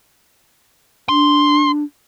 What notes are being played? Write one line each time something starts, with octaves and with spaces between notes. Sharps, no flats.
D4 C6